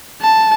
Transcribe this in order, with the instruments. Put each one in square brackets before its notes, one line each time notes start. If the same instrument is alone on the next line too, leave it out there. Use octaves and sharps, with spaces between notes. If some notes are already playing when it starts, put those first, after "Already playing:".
[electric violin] A5